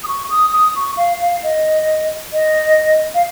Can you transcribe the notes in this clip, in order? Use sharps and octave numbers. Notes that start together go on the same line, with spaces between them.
D#6
C#6
D#6
D#6
C#6
F5
F5
D#5
D#5
F5